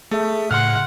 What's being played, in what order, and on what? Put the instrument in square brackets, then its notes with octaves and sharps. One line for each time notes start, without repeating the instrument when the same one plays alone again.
[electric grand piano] A3 [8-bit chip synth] G#4 E5
[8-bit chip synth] A2 C#3 [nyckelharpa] F#5 [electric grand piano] C6 F6